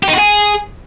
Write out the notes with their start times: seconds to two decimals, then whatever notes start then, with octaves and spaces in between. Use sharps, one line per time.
0.03 G4
0.08 D#4
0.13 F#4
0.18 G#4